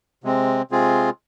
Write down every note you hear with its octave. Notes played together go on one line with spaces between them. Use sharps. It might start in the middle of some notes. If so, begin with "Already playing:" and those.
C3 G#3 C4
C3 G#3 C4 F4 G#4